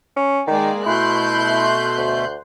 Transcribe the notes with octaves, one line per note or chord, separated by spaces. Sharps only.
C#4
D#3 G#3 A#3 D5
B2 A3 E4 C6 F#6 G6
D2